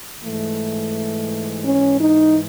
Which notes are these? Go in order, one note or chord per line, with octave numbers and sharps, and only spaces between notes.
G#2 E3 A3
C#4
D#4